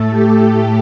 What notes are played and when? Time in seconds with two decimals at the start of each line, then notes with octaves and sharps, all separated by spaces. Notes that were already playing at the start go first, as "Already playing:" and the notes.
Already playing: A2 A3 A4
0.11 G4